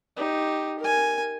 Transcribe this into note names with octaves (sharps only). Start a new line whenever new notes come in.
D#4 G4
A#4 G#5